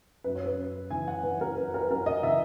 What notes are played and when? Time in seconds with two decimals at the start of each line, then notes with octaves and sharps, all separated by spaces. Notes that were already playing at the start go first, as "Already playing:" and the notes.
0.24 F#2 B4
0.35 C#5
0.46 B4
0.58 F#2
0.90 E3 G#5
1.08 F#5
1.23 E3 B4
1.41 A#4
1.57 F#2 B4
1.74 A#4
1.82 B4
1.90 F#2 A#4
2.06 D#5
2.23 E3 E5